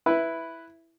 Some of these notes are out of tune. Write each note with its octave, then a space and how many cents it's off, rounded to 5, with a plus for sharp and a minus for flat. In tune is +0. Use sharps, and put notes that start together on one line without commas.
E4 +0 B4 +0